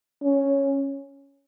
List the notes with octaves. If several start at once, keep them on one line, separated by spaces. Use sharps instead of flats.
C#4